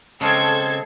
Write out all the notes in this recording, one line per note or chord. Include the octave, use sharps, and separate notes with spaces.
C#3 G#3 C4 A4 G#6